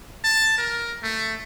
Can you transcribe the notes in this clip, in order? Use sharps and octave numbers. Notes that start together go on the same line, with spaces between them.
A5
A#4
A3